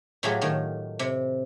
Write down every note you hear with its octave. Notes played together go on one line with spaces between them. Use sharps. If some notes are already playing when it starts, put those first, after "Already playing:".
A2 E3 F#3 F4 G4 G#4
A2 D#3
C3